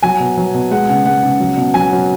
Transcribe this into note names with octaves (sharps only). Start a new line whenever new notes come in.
F#3 G#5
B2
F#3
B2
G#3 F#5
C#3 F#5
G#3 F#5
C#3
F#3
B2
F#3 G#5
F#3